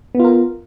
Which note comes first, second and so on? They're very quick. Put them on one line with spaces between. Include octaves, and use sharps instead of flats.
B3 F4 A#4